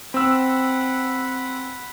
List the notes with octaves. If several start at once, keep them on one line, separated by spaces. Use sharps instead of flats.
C4 F#5 B5 E6